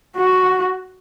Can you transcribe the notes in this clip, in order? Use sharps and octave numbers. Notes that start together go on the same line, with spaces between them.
F#4